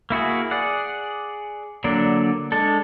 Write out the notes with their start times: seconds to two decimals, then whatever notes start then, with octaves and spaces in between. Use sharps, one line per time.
0.10 A#3 E4 F#4 G#4
0.51 G#4 D5 F#5
1.84 D3 F#3 A#3 D4 D5
2.52 G#3 D4 A4